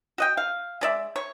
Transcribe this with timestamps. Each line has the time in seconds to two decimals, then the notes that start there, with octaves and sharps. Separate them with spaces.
0.18 F#4 D#5 G5
0.37 F5
0.81 G#3 D5 E5
1.16 C#5